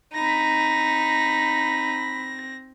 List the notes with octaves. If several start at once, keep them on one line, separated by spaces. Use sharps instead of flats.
C4 D#4 B5 A#6